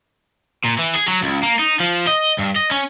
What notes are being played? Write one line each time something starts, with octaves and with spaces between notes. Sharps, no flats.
A#2
E3
G#4
F#3
C#2
A#3
D#4
F3
D#5
G2
D#5
C#4